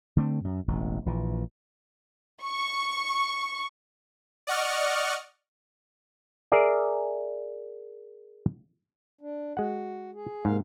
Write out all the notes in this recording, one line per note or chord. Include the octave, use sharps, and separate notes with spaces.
D3 A3 C4
F#2
E1 A1
A#1 A#2 E3
C#6
D5 D#5 F#5 C#6 F6
G#4 A#4 D5 E5
D4
G#3 F#4 F#5
G#4
G#2 C3 A#3 F5